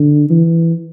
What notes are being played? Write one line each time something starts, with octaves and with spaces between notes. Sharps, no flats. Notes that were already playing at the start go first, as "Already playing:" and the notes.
Already playing: D3
E3